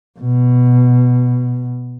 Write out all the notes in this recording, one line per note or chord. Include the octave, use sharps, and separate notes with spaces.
B2